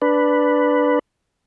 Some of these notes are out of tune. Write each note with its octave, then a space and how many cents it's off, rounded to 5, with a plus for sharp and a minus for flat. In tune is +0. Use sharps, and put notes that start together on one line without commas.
D4 +0 B4 +0